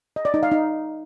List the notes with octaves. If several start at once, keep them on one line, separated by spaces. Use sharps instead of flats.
D#5
D5
D#4
F5
D#4